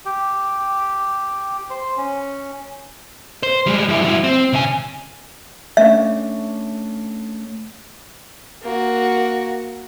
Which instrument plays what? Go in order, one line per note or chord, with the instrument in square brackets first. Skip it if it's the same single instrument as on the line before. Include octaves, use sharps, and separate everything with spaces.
[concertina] G4
C5
C#4
[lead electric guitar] C5
G3 G#3
G2 E4
F#3 E4
C4
C#3 G#5
[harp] A3 C#4 D4 [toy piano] E5
[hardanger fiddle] A#3 F#4